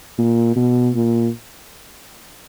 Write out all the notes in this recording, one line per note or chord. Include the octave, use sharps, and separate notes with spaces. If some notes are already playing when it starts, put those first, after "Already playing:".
A#2
B2
A#2